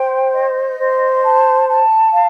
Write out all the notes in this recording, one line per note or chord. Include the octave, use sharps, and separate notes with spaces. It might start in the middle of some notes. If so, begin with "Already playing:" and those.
Already playing: C5 G5
D#5
C5
A5
A5
F5